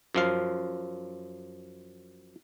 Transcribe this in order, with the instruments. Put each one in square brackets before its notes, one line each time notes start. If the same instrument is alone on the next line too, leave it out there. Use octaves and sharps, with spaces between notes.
[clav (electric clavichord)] F#2 F3 F5